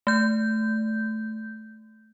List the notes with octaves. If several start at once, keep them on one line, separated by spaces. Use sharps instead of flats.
A3 G6